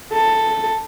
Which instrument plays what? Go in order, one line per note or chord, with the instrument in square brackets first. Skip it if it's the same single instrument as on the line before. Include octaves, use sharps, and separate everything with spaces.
[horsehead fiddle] A4